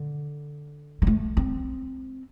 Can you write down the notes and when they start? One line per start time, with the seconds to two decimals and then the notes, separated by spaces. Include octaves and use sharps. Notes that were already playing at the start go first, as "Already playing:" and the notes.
Already playing: D3
1.02 G3
1.07 A3
1.37 C4